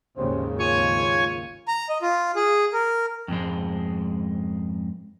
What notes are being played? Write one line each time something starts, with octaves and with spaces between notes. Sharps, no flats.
G#1 D#2 C#3 G3 C#4 C5
F4 C#5 G#5 C#6
A#5
D#5
F4
G#4
A#4
F2 G#2 G#3